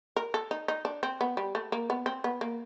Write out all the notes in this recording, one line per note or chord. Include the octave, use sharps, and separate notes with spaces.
A#4
A4
D#4
D#4
D4
C4
B3
G3
A3
A#3
B3
C4
B3
A#3